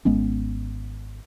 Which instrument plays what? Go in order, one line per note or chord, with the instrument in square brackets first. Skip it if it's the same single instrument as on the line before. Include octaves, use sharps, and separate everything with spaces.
[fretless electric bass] G#1 G#3 B3 C#4